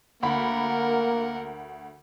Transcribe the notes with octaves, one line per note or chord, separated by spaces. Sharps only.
D2 A#3 A#4 F#5 B5